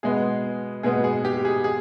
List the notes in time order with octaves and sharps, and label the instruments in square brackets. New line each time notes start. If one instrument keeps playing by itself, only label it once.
[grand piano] B2 G#3 B3 G#4
B2 G#3 B3 G#4
G#4
G4
G#4
G#4